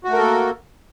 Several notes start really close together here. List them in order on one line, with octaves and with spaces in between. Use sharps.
F#4 A3 A#4 A4 A#3